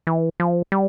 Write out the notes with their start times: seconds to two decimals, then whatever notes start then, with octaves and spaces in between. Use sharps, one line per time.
0.07 E3
0.40 F3
0.72 G3